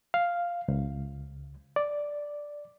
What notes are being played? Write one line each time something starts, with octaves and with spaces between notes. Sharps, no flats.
F5
C#2
D5